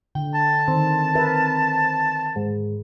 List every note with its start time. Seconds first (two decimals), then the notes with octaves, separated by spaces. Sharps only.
0.15 D3 G5
0.35 A5
0.68 D#3 C4
1.15 A#4 B4 E5
2.36 G#2